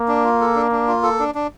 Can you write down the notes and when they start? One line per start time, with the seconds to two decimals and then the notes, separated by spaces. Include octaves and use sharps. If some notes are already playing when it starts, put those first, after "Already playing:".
Already playing: A#3
0.08 D4
0.24 F4
0.40 A4
0.56 D4
0.71 D4
0.88 F4
1.03 A4
1.19 D4
1.35 D4